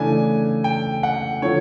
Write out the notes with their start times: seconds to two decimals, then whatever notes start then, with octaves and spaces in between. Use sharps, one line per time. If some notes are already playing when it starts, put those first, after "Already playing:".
Already playing: C#3 E3 A3 D4 G#5
0.64 G5
1.03 F#5
1.42 D3 F3 C#5